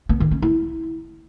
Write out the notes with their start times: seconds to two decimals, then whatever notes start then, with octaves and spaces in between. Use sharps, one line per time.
0.09 B3
0.20 D#3
0.31 C#4
0.42 E4